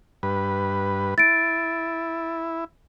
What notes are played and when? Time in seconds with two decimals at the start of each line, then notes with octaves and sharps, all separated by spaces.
0.23 G2 B4
1.18 E4 A6 D7